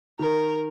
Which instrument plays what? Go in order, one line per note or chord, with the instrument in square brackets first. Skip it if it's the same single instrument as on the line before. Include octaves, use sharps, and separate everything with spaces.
[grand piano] D#3 [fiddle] A#4